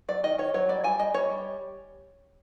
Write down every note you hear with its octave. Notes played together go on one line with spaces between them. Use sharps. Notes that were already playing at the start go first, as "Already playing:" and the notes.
F#3 D5
D#3 D#5
D#3 C#5
F#3 C#5
G3 D5
G3 G#5
G3 D#5
G3 C#5
G3